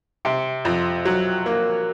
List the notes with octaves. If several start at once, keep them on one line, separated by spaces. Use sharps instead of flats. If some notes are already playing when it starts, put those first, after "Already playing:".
C3
F2
F#3
A#3